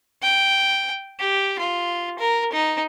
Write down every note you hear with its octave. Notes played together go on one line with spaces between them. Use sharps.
G5
G4
F4
A#4
D#4